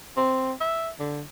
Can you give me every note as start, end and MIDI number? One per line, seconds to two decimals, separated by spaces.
0.17 0.52 60
0.61 0.89 76
0.99 1.22 50